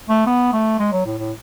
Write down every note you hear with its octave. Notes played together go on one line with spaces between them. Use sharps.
A3
B3
A3
G#3
F#3
A2
A2